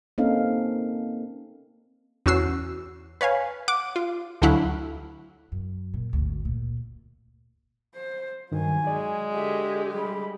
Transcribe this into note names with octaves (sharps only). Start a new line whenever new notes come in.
A#3 C4 C#4 D#4 A4 F5
E2 C#4 F#4 E6 C7
B4 C#5 F5 G#5
F#5 D6
F4
D2 D3 F#3 E4 F5 F#6
F#2
A#2
G#1 D2
A#2
C5
G2 D#3 F#3 G#5
G#3 D5
D3 F#4 G4 E5
G3 B5